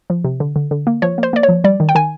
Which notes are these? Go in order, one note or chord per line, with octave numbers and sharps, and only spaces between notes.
F3
C3
D3
D3
D3
A#3
F3 C#5
A#3
C5
A#3 D5
C#5
F3
G3 D5
D#3
G5
D#3 G#5